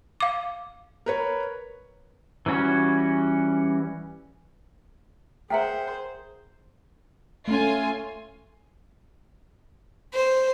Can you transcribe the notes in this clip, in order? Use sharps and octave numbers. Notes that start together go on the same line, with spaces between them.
F5 D6
A#4 B4 C#5
E3 G3 C#4 F#4
G#4 A#4 C5 E5 F#5 G5 A#5
A3 C#4 F4 G#5
C5